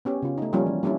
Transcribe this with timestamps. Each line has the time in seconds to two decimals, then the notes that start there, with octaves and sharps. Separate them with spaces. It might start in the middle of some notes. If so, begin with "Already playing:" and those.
0.05 B3 C#4 G4
0.22 C#3 F4
0.38 A3 D#4
0.53 F3 G3 A#3 B3 C#4 F4
0.66 E3
0.83 G3 A#3 C#4 D4 E4